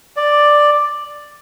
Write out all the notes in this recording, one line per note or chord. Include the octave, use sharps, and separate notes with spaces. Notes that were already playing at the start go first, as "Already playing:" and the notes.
D5